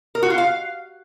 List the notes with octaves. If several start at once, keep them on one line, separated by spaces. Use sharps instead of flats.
A#4
F#4
F4
F5